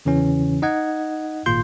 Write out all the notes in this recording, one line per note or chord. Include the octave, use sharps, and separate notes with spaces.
E2 C#3 E3 C#4
D#4 D#5 F#5 G#6
G#1 A#2 F4 C6 G6